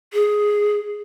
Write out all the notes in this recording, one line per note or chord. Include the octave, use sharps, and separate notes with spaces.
G#4